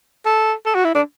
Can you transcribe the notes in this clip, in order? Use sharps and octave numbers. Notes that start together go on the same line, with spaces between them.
A4
A4
F#4
E4
D4